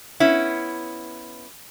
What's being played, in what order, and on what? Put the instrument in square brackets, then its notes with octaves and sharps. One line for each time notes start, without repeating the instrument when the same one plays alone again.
[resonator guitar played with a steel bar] B3 C#4 E4